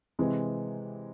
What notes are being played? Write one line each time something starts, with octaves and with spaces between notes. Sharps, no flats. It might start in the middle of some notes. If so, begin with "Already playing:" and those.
C3 E3 G#3 C4